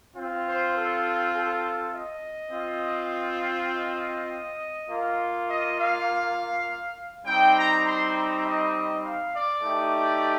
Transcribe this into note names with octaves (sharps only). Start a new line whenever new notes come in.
C4 F4
C5
A4
A4
D#5
C4 F4
D#5
A#3 F4
D#5
F5
G3 C4 D#4 G5
A#5
C6
A#5
D#5
F5
D5
A3 D#4 G4